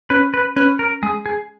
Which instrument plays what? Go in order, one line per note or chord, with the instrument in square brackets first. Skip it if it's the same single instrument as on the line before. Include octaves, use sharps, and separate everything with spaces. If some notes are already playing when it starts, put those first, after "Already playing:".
[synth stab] C#4 [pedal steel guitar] B4
[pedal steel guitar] B4
[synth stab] C#4 [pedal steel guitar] B4
[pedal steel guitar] A#4
[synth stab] G#3 [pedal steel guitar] G#4
[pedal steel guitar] G#4